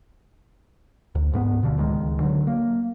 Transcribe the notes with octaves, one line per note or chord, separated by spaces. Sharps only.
D2
C#2 G#2 A#3 B3
D1 B2 D3 F3
D1 C#2 D#3 G#3
D3 F#3
A#3